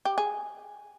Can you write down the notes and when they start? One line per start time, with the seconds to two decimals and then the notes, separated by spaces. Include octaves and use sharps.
0.05 G4
0.18 G#4